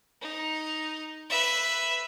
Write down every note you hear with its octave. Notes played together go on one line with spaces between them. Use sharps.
D#4
B4 E5